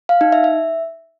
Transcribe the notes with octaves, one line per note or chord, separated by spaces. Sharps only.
F5
D#4
E5
E5